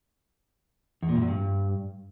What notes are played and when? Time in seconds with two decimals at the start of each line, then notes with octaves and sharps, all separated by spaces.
1.02 E2
1.09 A#2
1.15 G2
1.22 F#2
1.28 G2